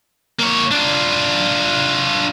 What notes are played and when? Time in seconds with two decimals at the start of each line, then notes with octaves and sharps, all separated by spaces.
0.40 A#3 C#5
0.71 D4 F4